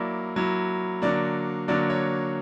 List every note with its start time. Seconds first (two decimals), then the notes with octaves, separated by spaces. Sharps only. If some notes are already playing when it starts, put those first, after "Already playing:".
Already playing: F#3 A#3 E4 D5
0.36 F#3 A#3 E4
1.02 D3 F#3 A#3 D5
1.68 D3 F#3 A#3 D5
1.90 C#5